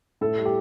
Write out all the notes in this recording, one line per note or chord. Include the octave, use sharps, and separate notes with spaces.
A2 A4
G3
G4